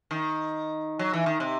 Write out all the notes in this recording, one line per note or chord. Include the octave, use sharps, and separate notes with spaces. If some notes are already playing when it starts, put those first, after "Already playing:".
D#3
F#3
E3
D#3
C3